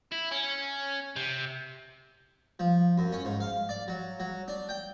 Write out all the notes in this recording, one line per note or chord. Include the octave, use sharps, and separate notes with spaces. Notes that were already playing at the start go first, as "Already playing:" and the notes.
E4
C#4
C3
F3
F#2
C#4
G#2
F5
D5
F#3
F#3
D4
G5